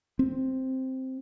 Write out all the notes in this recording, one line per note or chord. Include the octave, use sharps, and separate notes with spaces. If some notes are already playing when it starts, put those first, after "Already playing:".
C4